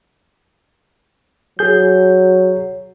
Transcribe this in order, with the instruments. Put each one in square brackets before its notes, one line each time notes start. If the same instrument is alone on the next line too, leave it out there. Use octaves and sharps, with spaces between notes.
[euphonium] F#3 [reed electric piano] G#4 G6